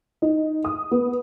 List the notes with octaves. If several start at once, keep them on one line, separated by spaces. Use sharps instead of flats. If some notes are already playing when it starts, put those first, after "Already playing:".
D#4
D#6
B3